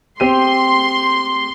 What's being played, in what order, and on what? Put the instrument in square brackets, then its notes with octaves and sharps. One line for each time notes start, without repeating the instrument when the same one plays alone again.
[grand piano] C4 G4 D#7 [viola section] C6